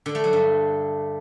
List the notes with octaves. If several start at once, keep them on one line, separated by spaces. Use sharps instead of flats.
D3
A3
F#3
G2